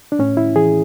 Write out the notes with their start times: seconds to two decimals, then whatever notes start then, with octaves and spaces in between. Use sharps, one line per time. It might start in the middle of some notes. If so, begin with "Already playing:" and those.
0.12 D4
0.19 A2 C#4
0.37 E4
0.56 E3 G#4